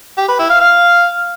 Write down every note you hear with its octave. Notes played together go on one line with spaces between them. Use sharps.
G4
B4
E4
F5
F5